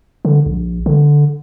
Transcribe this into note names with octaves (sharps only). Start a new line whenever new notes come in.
D3
A#1
D3